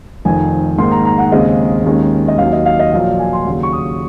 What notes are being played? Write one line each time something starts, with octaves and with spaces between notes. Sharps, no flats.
F1 F2 D#3 G#5
G#2 D#3 A#3 C6
A#5
A#5
F#5
D#2 C#3 G#3 C4 D#5
D#2 D#3 G#3 C#4
D#5
D#2 D#3 F#3 F5
D#5
F5
D#5
A#1 A#2 F#3 F5
G#5
C6
D#2 C#3 F#3
C#6
D#6